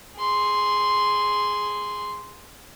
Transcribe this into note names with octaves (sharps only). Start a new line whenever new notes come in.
G#4 C6